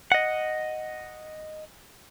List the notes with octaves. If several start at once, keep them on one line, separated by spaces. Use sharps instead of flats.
D#5 F#5